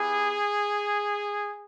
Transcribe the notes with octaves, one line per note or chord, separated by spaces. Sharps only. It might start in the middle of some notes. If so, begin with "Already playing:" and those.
Already playing: B3 E4 G4 G#4